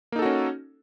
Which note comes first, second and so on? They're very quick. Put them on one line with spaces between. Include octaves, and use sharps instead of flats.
A#3 D#4 A4 F#4 C#4